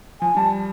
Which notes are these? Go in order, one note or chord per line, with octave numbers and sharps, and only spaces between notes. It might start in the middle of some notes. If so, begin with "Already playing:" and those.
F3 G#5
G3 A5